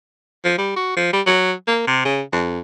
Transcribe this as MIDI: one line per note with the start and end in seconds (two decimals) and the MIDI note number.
0.45 0.58 53
0.58 0.76 55
0.76 0.94 66
0.97 1.12 53
1.13 1.22 55
1.26 1.53 54
1.68 1.83 58
1.87 2.05 48
2.05 2.22 49
2.32 2.59 41